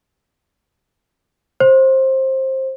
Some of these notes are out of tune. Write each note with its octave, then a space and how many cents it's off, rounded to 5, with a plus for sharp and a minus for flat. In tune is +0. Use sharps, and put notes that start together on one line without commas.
C5 +20